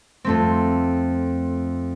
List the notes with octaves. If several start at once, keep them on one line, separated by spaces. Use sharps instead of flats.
F2 A3 C4